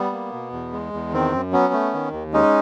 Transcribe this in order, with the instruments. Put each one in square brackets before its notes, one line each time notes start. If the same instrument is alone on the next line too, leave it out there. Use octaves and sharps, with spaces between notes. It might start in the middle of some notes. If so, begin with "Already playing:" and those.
Already playing: [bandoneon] G3 B3
A#3
B2
E2
G#3
E2
D#3 C4
F#2
F#3 B3 C#4
A3
D#3
D#2
G#3 C#4 D#4